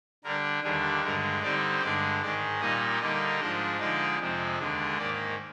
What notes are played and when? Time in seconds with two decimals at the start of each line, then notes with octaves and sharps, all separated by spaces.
0.24 D3 G3 D4 A#4
0.64 D#2 D3 G3 D4 G#4
1.03 G2 D3 G#3 A#4
1.42 D3 G3 C4 D#4 D5
1.82 G2 D3 G#3 D4 D5
2.22 G#2 D#3 G#3 D5
2.61 A#2 G3 A#3 D#4 D#5
3.00 D3 G3 A#3 D#4 D#5
3.40 G#2 F3 G#3 D4 D#5
3.79 D3 F3 G#3 D#4 D5
4.19 F2 C3 F3 G#3 C4
4.58 D#2 D3 G#3 D4
4.98 G#2 D#3 A#3 D5